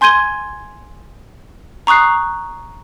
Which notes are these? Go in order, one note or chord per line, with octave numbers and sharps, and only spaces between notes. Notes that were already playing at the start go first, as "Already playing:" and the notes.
G#5 C6 G6 G#6 D#7 G7
A#5 C#6 D#6 F#6 C7